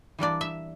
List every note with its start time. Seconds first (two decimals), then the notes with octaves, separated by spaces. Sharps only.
0.19 E3 G3 A#3 D4 D5
0.41 E5